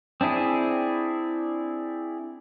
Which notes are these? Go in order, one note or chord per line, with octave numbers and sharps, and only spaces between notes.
C4 D4 E4 G#4